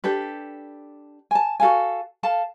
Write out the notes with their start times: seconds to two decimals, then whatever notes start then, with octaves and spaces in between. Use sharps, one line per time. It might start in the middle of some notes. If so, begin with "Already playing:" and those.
0.04 D4 G4 A4 B4
1.31 G#5 A5
1.60 F#4 A4 F5 G#5
2.23 A4 F5 A5